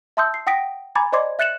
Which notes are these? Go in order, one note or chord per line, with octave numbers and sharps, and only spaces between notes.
E5 A5 C6 D#6 E6 G6
C7
F#5 G5 D#6 A#6 B6 D7
G#5 A#5 B5 D6 G#6 A6
C5 D5 D#5 C6 D6 G#6
E5 F#6 A6 C#7 E7 F#7